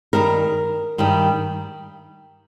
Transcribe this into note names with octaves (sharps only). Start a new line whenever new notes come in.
G2 D#3 G3 A#4
G2 D#3 G3